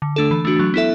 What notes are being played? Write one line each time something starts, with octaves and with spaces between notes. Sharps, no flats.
D3
A3 D4 A4
E3
A3 D4 F#4
F#3
B3 E4 A4 E5